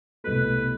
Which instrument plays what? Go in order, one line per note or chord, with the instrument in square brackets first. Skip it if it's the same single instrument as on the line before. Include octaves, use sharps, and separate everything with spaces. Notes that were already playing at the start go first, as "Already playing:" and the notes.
[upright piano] C2 B2 A3 [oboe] B4